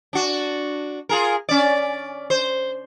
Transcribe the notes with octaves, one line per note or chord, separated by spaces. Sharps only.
D4 F#4
F4 G#4 A#4
C#4 D5
C5